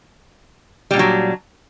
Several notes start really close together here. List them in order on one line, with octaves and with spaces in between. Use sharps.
G3 A#2 D4 F#3